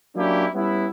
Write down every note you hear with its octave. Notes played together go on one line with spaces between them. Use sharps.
F#3 A#3 C#4 D4 E4 G4
G3 B3 C#4 E4